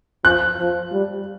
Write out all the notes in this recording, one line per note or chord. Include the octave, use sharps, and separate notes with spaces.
F3 F#6
F3
G3